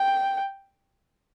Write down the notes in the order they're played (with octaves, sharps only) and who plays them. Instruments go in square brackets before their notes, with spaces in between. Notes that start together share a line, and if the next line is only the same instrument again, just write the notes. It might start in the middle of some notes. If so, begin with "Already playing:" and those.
Already playing: [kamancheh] G5